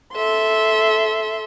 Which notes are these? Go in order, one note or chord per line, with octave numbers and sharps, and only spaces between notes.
A4 E5 C6